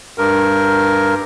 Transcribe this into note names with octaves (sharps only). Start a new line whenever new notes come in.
G2 A#4